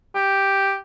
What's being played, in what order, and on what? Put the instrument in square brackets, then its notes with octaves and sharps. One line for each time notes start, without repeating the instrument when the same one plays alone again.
[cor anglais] G4